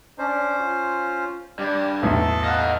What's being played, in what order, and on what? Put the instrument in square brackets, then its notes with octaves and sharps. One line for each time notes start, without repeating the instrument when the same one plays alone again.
[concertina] C#4 C5 [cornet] D4
[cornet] F4
[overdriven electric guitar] G2 [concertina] G4 [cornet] D5
[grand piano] B1 E2 A2 [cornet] A4
[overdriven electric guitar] D#5 F#5 [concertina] F5